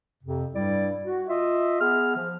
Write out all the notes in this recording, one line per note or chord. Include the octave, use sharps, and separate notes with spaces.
F2 C3
G2 G3 E4 D5
F#4
F4 D#5 E5
B3 G#4 F6
F3